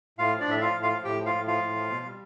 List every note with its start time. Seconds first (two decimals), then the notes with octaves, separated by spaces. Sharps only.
0.18 A2 F4 F5
0.33 F3
0.40 D4 D5
0.48 A2 E5
0.61 F3 F4 F5
0.75 A2
0.83 F4 F5
0.90 F3
1.04 A2 G4 G5
1.19 F3
1.26 F4 F5
1.33 A2
1.47 F3 F4 F5
1.62 A2
1.76 F3
1.90 B2
2.04 G3